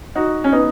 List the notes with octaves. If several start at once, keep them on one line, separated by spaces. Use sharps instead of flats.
D#4 F#4
C#4
B3 D#4